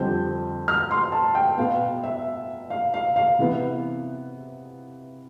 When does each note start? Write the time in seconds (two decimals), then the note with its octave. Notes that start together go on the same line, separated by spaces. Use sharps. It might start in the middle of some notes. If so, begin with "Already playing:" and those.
Already playing: F2 D3 G3 C4 G6
0.68 F6
0.91 C6
1.12 A5
1.35 G5
1.58 B2 B3 F5
2.04 E5
2.70 F5
2.94 F5
3.16 F5
3.39 C3 E3 B3